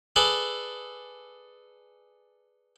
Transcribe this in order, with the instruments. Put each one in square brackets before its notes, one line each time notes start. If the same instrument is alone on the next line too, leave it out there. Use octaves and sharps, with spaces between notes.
[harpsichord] G#4 A4 B4 D5 G#5